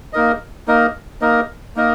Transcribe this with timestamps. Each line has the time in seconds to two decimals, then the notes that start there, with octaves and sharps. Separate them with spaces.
0.13 A#3 D#4 A#4 D#5
0.68 A#3 D#4 A#4 D#5
1.22 A#3 D#4 A#4 D#5
1.76 A#3 D#4 A#4 D#5